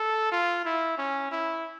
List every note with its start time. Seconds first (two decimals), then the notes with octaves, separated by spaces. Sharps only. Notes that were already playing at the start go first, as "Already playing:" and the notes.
Already playing: A4
0.32 F4
0.65 E4
0.98 C#4
1.31 E4